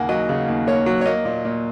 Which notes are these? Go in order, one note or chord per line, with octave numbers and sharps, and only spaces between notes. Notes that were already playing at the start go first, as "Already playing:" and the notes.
Already playing: D#2 C#3 A#3 F#5 G#5
F#3 D#5
C#3
D#2
A#3 C#5
F#3
C#5
A#3 D#5
A#2
A#2